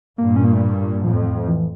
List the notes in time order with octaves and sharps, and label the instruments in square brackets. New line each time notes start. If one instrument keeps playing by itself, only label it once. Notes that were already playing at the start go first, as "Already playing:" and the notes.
[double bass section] G2 A#2 [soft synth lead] A#3
[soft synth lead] C#4
A#3
A3
G3
[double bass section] F2 A2 [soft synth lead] F3
[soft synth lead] F3
F3
E3